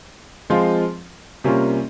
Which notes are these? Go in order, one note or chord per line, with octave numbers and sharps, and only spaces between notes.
F3 G#3 C4 F4
C3 G3 A#3 C#4 F4